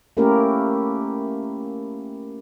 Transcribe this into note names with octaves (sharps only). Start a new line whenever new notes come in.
A3 A#3 C#4 E4 G4 A#4